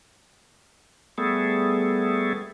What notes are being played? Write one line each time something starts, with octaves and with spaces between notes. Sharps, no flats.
G3 A3 B3 G#4 A4